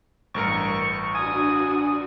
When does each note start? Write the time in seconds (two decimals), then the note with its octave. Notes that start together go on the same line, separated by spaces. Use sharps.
0.34 A1 G2 A#4 C#6
1.15 D4 F#4 G#5 D#6